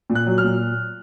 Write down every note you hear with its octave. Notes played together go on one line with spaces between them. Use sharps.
A#2
F#6
F#3
F6
A#2